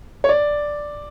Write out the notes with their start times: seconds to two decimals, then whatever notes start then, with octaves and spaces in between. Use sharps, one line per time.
0.24 C#5
0.29 D5